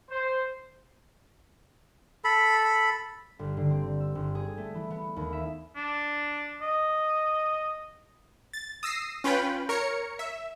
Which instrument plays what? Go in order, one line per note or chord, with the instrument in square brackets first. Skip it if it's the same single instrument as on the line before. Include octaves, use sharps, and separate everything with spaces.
[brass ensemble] C5
[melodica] A4 B5
[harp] G1
D3
C4
E6
G1
G#4
A3
E3
B3
D#2
E5
[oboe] D4
D#5
[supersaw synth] A6
D#6 E6 A#6 C7
C#4 F4 B4 G5 B5
A#4 C#5 C#7
E5